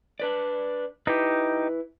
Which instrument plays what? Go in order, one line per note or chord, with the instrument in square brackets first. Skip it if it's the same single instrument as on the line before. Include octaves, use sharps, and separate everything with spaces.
[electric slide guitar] D4 B4 D5
[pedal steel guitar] D#4 G4 [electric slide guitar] E4 B4